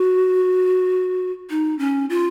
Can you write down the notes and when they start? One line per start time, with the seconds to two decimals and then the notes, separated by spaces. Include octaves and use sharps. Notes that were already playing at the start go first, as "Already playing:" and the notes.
Already playing: F#4
1.50 D#4
1.79 C#4
2.10 F4